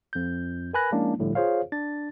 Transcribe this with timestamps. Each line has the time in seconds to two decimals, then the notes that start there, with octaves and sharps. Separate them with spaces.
0.13 F2 G6
0.73 A#4 B4 G#5 B5 F#6 A#6
0.92 F3 G#3 A#3 C#4 D4 E4
1.18 G1 C2 A2 D3 F3 G3
1.35 F4 G#4 C5 C#5 F5
1.72 D4 A6